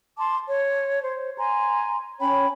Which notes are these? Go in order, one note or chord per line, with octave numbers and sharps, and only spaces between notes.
A5 C6 D6
C#5
C5
G#5 A#5 C6
C#4 C#5 G5 B5